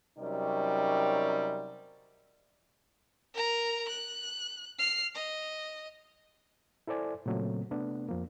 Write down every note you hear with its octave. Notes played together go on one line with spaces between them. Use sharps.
C3 F#3 G3 C#4 D#4 A#4
A#4 A#5
F#6
F6 C7
D#5
E4 A4 C5 D5 G#5
A#2 C#3 F#3 A3 C4
C3 A3 B3 D4
F2 F3 A#3